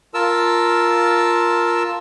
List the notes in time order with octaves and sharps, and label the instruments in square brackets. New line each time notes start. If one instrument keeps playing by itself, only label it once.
[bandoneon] F4 A#4 A5 E6